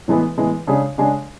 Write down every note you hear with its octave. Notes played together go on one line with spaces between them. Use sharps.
A2 E3 G#3 B3
A2 E3 G#3 B3
C#3 G#3 D4 G#4
C#3 G#3 D4 G#4